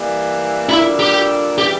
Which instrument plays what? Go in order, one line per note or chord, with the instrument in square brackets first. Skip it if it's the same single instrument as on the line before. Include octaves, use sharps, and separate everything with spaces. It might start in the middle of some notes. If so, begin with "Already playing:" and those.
Already playing: [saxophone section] E3 G3 A#3
[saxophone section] A#2 G3 D4 A4 [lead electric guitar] E4
[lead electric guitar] G4
[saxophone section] C#3 E3 G3 [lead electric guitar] G4